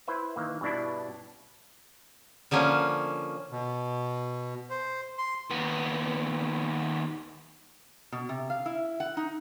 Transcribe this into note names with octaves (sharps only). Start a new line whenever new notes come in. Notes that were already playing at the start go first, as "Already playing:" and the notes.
E4 B4 C5 E5
D#3 E3 A#3
G2 B2 D4 E4
D3 F3 A#3 C#4
B2
C5
C6
D#2 B3
B2
C3
F5
E4
F#5
D#4